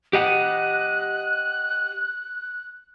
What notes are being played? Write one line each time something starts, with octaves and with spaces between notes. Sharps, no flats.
G4 D#5 F#5 F#6